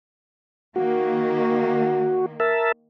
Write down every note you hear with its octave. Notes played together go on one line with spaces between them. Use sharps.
D#3 A#3 F#4
A#4 E5 A5